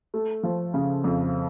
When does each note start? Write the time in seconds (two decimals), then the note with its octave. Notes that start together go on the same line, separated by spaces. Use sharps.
0.14 A3
0.43 F3
0.74 C#3
1.04 F2